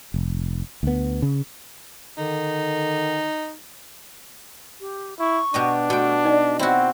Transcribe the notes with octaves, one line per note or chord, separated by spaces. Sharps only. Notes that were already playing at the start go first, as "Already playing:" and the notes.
F1
D2 B3
C#3
D3 D#3 D#4
G4
E4 C#6
B2 D4 G4 D#5
B2 A3 F#4 G5
D#4 D5 D#5
C4 E4 F#4